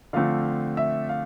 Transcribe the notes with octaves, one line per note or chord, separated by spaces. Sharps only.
D3 F3 A3 C4 F5
E5
F5